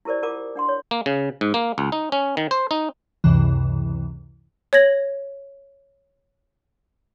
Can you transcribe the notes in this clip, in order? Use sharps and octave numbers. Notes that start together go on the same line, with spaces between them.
E4 G4 A#4 C5 D5
E4 F4 A#4 F#5 D6 D#6
D4 F#5 C6
C#5
A#3
C#3
G#2
A#3
C#2
D#4
C#4
D#3
C5
D#4
C#2 F#2 C3 E3
C#5 G#6 A#6 F#7